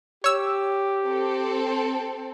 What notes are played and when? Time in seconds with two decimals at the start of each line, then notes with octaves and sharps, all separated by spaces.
0.24 G4 C#5 E6
1.06 C4 A4